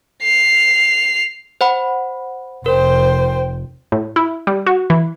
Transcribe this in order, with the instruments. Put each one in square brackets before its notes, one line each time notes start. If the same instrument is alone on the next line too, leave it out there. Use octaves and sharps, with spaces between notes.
[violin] C7 F7
[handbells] C5 F#5 B5
[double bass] F1 [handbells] A#4 [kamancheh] C5 G5
[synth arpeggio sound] A2
E4
G3
F#4
E3